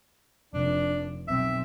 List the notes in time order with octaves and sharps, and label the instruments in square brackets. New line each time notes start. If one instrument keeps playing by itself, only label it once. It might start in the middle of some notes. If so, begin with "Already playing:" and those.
[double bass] F1 [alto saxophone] D4
[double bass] B1 C4 [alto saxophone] E5